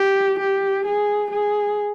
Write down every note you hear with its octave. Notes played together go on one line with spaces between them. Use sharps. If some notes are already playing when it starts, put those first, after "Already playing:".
Already playing: G4
G4
G#4
G#4